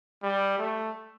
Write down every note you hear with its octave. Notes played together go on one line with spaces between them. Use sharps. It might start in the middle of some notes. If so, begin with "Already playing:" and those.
G3
A3